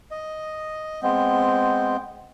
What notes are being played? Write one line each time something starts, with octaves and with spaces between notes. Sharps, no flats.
D#5
G#3 B3 C4